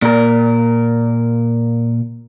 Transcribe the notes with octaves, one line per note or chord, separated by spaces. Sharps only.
A#2 A#4